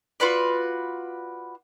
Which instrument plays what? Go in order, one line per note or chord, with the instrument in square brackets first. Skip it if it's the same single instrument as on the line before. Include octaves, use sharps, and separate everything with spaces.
[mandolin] F4 F#4 B4 D5